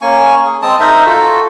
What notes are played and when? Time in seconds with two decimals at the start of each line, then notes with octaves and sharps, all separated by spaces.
0.02 A#3 C#4 G#5 C#6
0.45 G#4
0.62 G#3 C4 A5 D#6
0.80 D#4 A#4 C5 E5
1.06 F4 F#4 A4